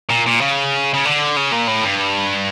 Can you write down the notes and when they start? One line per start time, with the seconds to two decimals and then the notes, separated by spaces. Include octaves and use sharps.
0.10 A#2
0.26 A#2
0.41 C#3
0.94 C#3
1.05 D3
1.37 C#3
1.52 A#2
1.68 A2
1.84 G2